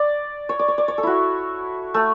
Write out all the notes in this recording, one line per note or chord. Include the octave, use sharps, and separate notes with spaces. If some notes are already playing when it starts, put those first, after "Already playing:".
Already playing: D5
C#5
D5
C#5
D5
C#5
A4
E4 F#4
A3